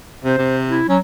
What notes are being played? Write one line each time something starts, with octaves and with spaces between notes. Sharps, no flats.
C3 C5
C3
E4
F#3 C#4